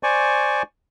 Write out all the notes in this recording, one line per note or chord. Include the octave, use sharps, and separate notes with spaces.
C5 D5 G#5 C#6